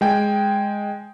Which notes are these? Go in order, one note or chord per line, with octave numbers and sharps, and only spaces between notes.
G#3 G5 G#5